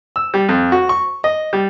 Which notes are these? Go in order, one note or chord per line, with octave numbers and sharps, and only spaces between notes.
E6
G3
F2
F#4
C#6
D#5
G3